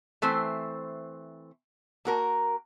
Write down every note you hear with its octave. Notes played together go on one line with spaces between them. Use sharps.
E3 A3 C4 C5
A#3 F#4 A#4